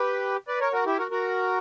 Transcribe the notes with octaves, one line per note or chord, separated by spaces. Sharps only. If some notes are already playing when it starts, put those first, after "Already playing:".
Already playing: G4 B4
B4 D5
A#4 C#5
F#4 A#4
E4 G4
F#4 A#4
F#4 A#4